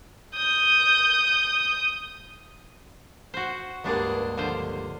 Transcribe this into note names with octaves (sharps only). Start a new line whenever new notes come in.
D#6 G6
F#4 C5
C#2 G2 A#3 B3 D4 G#4
D3 F3 C5